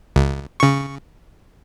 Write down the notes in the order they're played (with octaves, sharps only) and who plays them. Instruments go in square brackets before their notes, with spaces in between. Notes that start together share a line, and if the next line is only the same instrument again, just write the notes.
[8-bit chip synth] C#2
C#3 C#6